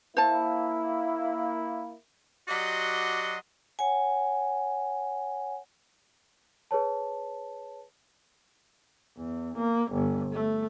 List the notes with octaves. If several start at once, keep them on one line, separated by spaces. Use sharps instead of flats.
A#3 E4 C5 A5
F#3 F#4 G4 D5 D#5 C6
C#5 F#5 G#5
G#4 B4 C#5 A5
E2
A#3
G1
A3